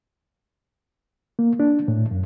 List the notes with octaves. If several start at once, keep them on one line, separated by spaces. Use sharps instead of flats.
A#3
D4
A2
F#2